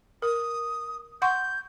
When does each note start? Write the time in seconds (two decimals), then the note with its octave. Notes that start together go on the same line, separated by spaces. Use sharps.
0.22 A#4 D#6
1.22 F#5 C6 C#6 G6